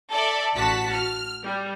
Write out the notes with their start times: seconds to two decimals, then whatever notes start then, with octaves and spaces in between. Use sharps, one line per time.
0.11 A4 D5 E5
0.56 A1 F#4 A5 B6
0.93 F6
1.43 G3